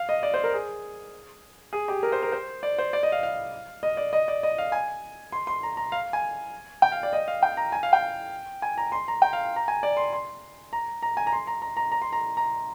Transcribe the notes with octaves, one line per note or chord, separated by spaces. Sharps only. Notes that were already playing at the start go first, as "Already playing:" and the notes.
Already playing: F5
D#5
D5
C5
A#4
G#4
G#4
G4
A#4
C5
A#4
C5
D5
C5
D5
D#5
F5
F5
D#5
D5
D#5
D5
D#5
F5
G#5
C6
C6
A#5
A#5
F5
G#5
G5
F5
D5
D#5
F5
G5
A#5
G#5
F5
G5
G#5
A#5
C6
A#5
G5
F5
A#5
G#5
D5
C6
C6
A#5
A#5
G#5
A#5
C6
A#5
A#5
A#5
A#5
C6
A#5
A#5